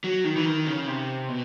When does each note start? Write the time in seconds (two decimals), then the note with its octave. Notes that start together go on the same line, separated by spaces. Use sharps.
0.04 F#3
0.24 D#3
0.36 E3
0.46 D#3
0.67 C#3
0.87 C3
1.28 B2